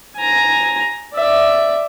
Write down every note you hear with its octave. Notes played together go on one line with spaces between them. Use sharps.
G#5 A#5
D5 E5